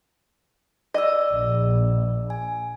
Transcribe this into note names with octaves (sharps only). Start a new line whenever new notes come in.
D5 D#5 E6
A#1
G#5